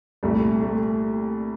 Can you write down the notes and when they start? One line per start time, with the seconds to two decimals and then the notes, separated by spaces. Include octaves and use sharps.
0.23 C2 A#2 G3 A3
0.61 A3